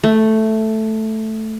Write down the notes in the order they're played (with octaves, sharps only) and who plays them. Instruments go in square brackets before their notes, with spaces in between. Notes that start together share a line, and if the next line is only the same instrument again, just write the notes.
[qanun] A3